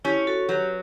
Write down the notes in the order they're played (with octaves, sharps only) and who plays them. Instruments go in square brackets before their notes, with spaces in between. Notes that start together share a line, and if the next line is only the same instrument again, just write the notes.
[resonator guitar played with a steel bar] C#4 [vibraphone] E4 G4
[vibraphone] F#4 A4
[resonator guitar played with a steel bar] F#3 [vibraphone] G4 B4